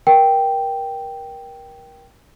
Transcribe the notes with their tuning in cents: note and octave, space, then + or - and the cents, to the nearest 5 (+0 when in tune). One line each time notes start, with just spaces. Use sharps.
A#4 +25 G5 +0